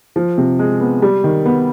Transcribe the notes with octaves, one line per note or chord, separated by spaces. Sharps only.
F3
C3
G#3
B3
G3
D#3
B3